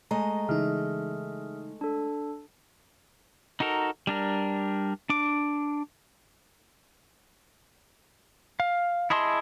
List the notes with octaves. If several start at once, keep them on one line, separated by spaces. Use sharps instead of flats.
G#3 A3 D#5 A#5
C#3 E3 D#4 G#4 E5 F6
D4 A4
D#4 F#4 A4 A#4
G3 D4 A#4
D4 D6
F5
E4 G#4 D#5 A5 C6